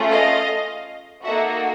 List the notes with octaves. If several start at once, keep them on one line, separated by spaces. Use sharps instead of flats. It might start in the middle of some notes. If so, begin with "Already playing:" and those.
Already playing: A3 C#4 F4 G#4
D#5 F5
A#3 D#4 F#4 A4 E5 F#5